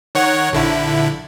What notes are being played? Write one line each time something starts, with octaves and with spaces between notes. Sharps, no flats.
D#3 C#5 F#5
A#1 D3 E4